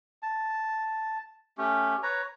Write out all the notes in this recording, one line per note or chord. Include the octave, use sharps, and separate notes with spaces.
A5
A3 C#4 G4
B4 C#5 A#5